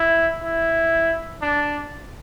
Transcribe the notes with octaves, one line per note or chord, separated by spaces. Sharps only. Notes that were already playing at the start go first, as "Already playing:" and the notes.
Already playing: E4
E4
D4